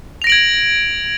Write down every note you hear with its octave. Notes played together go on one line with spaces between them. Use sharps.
G#6 A#6 D7 F7 F#7